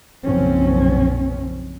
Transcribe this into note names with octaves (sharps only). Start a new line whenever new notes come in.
F#1 B1 A#2 F3 C4 C#4